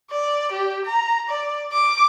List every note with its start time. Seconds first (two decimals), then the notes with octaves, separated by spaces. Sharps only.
0.11 D5
0.52 G4
0.86 A#5
1.29 D5
1.73 D6